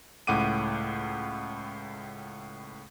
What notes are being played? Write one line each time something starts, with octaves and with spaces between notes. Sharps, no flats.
C#2 A2 F#5 D6 D#7